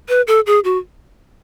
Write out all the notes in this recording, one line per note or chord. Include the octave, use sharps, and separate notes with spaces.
B4
A4
G#4
F#4